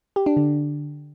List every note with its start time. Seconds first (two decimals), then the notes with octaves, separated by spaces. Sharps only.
0.16 G4
0.26 D4
0.37 D3